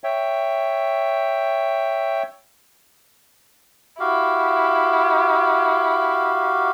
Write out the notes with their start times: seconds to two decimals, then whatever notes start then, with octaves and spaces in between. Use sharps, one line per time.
0.04 C#5 E5 G5
4.00 E4 F#4 G4 F5